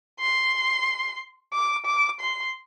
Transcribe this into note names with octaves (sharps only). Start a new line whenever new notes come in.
C6
D6
D6
C6